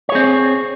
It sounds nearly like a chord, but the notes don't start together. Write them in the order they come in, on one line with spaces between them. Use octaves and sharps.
C#5 G#4 C4